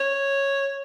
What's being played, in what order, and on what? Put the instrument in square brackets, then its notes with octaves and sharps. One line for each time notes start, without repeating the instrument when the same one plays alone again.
[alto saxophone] C#5